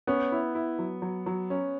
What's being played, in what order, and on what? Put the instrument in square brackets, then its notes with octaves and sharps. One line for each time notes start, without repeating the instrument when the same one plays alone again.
[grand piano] B3 [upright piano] C#4
[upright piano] E4
E4
F#3
F#3
F#3
C#4